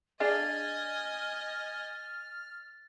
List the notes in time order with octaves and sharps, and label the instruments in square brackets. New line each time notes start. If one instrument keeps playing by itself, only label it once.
[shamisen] D4 G#4 F5 [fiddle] D#5 G#5 [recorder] F6 [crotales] A6